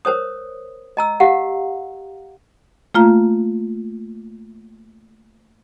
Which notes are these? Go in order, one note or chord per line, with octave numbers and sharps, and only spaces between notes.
A#4 C5 C#5 D#6
D#5 A#5 E6
G4 F5 F#5
A3 A#3 F4 F5 A#5